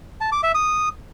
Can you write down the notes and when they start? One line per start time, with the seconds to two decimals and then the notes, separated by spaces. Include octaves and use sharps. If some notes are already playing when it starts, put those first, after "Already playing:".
0.21 A5
0.32 D6
0.43 E5
0.55 D#6